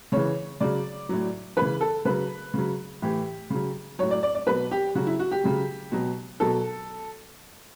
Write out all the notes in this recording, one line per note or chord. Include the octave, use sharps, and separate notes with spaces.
C#3 E3 C#5
C#3 F#3 D5
A2 F#3
C#3 E3 B4
A4
C#3 F#3 B4
C#3 F#3
A2 E3 G4
C#3 F#3
A2 F#3 C#5
D5
D5
D5
B2 F#3 B4
G4
C#3 F#3 F#4
E4
F#4
G4
C#3 F#3
B2 F#3
B2 F#3 A4